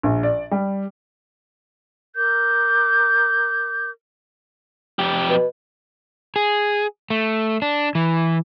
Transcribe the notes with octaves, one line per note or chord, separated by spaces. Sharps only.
A#1
D5
G3
A#4 D6 G6
F2 G4
B2
G#4
A3
D4
E3